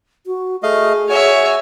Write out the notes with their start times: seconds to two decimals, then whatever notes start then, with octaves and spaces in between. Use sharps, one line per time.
0.27 F#4
0.63 A3 G#4 D#5 F5
1.09 F#4 C#5 E5 G#5